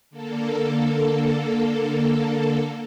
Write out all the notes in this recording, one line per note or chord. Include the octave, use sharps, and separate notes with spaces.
D3 A#3 A4